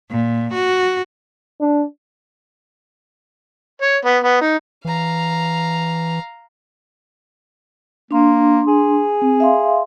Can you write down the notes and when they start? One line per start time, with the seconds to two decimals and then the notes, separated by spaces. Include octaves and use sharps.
0.12 A#2
0.55 F#4
1.61 D4
3.82 C#5
4.05 B3
4.24 B3
4.41 D#4
4.85 E3 F5 A#5
8.11 A#3 D4 C6
8.67 G#4
9.22 C4
9.40 E5 F5 C6